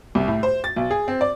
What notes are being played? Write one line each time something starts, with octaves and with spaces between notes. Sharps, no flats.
C2
A2
C5
A6
B1
G#4
C4
D5